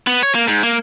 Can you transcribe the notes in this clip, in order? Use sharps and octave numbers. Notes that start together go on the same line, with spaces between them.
B3
C#5
A#3
G#2
A#3